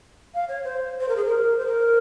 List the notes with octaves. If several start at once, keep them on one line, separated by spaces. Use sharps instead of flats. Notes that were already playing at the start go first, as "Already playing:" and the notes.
F5
C#5
C5
C5
A#4
G#4
A#4
C5
A#4